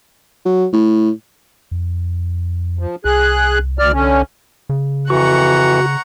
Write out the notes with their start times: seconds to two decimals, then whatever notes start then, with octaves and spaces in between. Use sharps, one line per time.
0.45 F#3
0.73 A2
1.71 F2
2.79 F3
3.05 C2 G#4 F#6
3.79 D2 D5 F6
3.94 D3 C#4
4.69 C#3
5.10 F2 E3 F#4 F#5 A#5 C#6